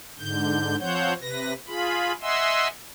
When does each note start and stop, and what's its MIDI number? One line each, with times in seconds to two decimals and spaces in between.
0.19 0.76 44
0.19 0.76 50
0.19 0.76 91
0.80 1.13 53
0.80 1.13 60
0.80 1.13 72
0.80 1.13 73
0.80 1.13 78
0.80 1.13 91
1.21 1.53 48
1.21 1.53 71
1.21 1.53 94
1.67 2.12 65
1.67 2.12 68
1.67 2.12 83
2.21 2.68 75
2.21 2.68 76
2.21 2.68 78
2.21 2.68 80
2.21 2.68 84
2.21 2.68 88